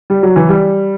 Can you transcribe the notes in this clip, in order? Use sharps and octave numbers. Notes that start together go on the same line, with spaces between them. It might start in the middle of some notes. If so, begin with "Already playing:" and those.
G3
F#3
E3
G3